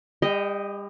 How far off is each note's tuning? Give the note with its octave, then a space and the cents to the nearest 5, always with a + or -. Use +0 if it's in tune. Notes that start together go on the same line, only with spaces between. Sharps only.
G3 +40 D#5 +0 G5 -10